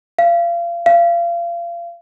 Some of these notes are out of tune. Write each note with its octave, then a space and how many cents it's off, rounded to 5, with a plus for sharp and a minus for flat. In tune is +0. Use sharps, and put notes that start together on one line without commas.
F5 -30
F5 -30